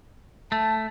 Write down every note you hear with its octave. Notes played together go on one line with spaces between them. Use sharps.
A3 A5